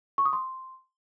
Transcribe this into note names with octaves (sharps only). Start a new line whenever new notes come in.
C#6
D#6
C6